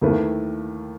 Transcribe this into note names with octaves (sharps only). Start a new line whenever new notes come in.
D#2 D#3 A3 E4 B4